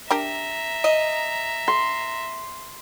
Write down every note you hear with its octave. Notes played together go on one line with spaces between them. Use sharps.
D4 G4 A#4 E5 A#5
D#5
C6